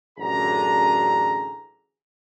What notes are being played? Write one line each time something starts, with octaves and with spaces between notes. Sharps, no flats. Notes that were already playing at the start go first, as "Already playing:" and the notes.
A1 F#2 D3 G#4 A#5